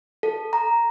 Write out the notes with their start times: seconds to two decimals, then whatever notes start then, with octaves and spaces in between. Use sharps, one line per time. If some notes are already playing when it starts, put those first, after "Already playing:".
0.23 A4
0.53 A#5